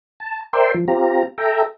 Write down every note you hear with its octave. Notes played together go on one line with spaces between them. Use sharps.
A5
A#4 C5 D5 E5 G5 C6
F3
C4 F4 G4 A#5
A4 E5 G5 A#5